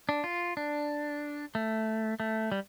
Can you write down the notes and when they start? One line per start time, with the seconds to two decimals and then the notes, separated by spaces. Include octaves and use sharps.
0.09 D4
0.24 F4
0.57 D4
1.55 A3
2.20 A3
2.52 G3